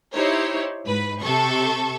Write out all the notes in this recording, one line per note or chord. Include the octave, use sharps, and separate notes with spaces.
D#4 E4 G4 C5 C#5
G#2 B4
C3 A4 A5 C#6